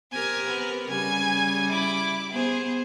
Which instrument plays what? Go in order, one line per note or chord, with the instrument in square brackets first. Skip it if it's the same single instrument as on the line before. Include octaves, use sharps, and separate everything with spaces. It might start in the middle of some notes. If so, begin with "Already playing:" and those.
[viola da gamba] C4 G4 A#4 [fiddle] G#5
[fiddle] B3
[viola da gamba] C#3 G3 [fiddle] G#5
[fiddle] E4 D6
[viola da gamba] B3 C5 [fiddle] G#4